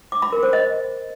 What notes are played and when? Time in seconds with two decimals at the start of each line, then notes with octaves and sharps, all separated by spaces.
0.12 D6
0.22 B5
0.33 A#4
0.43 C5
0.53 D#5